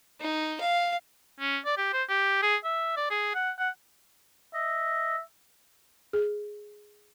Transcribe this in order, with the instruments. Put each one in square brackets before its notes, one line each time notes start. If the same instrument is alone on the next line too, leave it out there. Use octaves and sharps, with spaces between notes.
[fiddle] D#4
F5
[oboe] C#4
D5
G4
C5
G4
G#4
E5
D5
G#4
F#5
F#5
[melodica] D#5 [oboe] E5
[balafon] G#4